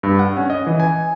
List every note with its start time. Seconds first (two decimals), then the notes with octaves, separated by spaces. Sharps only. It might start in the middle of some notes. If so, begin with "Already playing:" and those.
0.03 G2
0.19 F#5
0.37 C#4
0.50 D#5
0.67 E3
0.80 G#5